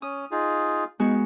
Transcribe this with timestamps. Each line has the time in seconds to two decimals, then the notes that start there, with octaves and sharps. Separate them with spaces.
0.02 C#4 D#6
0.31 D#4 F4 G#4
1.00 G#3 B3 D#4 F#4